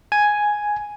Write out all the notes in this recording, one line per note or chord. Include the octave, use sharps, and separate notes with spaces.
G#5